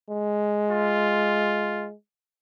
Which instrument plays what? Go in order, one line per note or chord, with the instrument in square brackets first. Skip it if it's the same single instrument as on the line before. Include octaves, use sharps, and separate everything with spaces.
[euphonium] G#3
[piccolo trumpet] F4